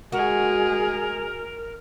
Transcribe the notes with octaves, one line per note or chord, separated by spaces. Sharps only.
G#3 F#4 G#4 A#4